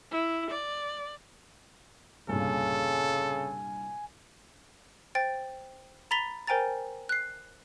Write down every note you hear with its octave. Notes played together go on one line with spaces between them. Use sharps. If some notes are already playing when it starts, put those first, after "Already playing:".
E4
D5
C2 G2 A#2 C#3 A4 G#5
C5 G5 A6
A#5 B5 A6 B6 F7 G7
A#4 C5 G5 G#5 A#5 A6
F#6 C7